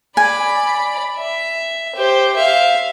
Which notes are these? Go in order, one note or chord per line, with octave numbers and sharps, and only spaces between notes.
D5 G#5 B5
E5
G4 C5
E5 F5